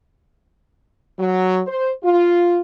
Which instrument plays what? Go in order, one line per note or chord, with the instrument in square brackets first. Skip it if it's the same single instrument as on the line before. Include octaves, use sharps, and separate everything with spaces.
[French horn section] F#3
C5
F4